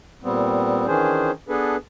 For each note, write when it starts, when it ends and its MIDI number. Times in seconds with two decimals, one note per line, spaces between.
0.23 0.86 46
0.23 0.86 55
0.23 0.86 59
0.23 0.86 60
0.87 1.31 51
0.87 1.31 52
0.87 1.31 61
0.87 1.31 62
0.87 1.31 68
0.87 1.31 72
1.49 1.76 59
1.49 1.76 62
1.49 1.76 68
1.49 1.76 69
1.49 1.76 71